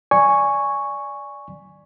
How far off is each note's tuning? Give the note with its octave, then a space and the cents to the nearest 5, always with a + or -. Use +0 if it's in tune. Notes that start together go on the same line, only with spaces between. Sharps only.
D5 +0 G#5 +0 C#6 +0